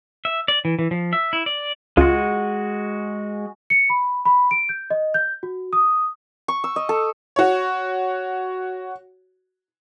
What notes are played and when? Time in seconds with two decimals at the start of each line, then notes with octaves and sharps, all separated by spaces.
0.25 E5
0.48 D5
0.65 E3
0.79 E3
0.91 F3
1.13 E5
1.33 E4
1.46 D5
1.97 C#2 G#3 F4 F#4
3.70 C#7
3.90 B5
4.25 B5
4.51 D7
4.69 G6
4.91 D#5
5.14 G6
5.43 F#4
5.73 D#6
6.48 C#6
6.64 E6
6.76 D#5
6.89 A4
7.36 F#4 C#5